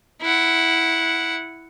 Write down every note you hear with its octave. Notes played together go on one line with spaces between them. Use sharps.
E4 F#5